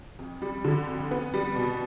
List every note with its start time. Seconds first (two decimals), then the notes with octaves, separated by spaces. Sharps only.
0.19 F2
0.42 G3
0.64 D3
0.87 F2
1.11 B3
1.34 G3
1.56 B2